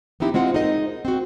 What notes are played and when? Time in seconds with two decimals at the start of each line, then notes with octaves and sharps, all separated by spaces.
0.20 B3 C4 D#4 E4 G4
0.34 G#3 C4 F4 F#5
0.54 D#4 G#4 A#4 C5 D#5
1.05 C4 F#4